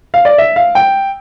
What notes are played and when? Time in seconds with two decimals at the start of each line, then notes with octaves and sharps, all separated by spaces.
0.14 F5
0.25 D5
0.38 E5
0.56 F5
0.75 G5